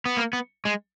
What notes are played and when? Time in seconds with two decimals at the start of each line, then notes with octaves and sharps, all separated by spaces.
0.06 B3
0.17 A#3
0.33 B3
0.65 G#3